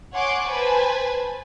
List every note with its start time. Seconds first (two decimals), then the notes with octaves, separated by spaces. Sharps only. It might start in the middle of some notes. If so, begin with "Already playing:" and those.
0.12 C#5 F#5 G#5 C6 D6
0.43 B4 C5 G#5 A5